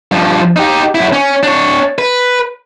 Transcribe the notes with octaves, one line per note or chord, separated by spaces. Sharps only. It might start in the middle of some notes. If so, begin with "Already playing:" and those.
G2 F3
D#4 G4
F#2 E4
C#4
D4 C#5
B4